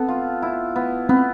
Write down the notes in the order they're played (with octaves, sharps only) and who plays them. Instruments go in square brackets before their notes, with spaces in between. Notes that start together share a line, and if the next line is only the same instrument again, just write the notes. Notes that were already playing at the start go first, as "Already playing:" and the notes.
Already playing: [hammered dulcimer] B3 A4 [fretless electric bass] C4
[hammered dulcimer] F4
E4
B3
[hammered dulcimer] B3 [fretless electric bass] C4